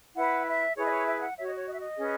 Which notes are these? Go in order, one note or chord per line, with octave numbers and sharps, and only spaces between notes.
E4 B4 F#5
E5
E4 G#4 B4 C#5
D#5
C#5
E5
F#5
F#4 C#5 E5
D#5
C#5
D#5
E5
D#5
C#4 G#4 B4